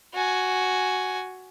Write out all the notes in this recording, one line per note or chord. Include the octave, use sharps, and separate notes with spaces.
F#4 G#5